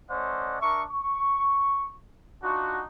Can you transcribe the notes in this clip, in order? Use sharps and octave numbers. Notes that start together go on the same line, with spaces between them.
A3 C#4 C5 D5 D#5 F#5
D4 A#4 E5 C#6
C#6
D4 D#4 F4 F#4